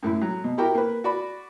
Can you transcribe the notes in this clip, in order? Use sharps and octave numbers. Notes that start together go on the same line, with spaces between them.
F#2 A2 E4
F#3
B2
E4 F#4 G4 A#4 G5
A#3 B4
F#4 D5 B5